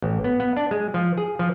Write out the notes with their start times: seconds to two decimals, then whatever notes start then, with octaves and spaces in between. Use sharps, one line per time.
0.02 A1
0.24 B3
0.40 B3
0.57 D4
0.71 G#3
0.94 F3
1.17 G#4
1.39 F3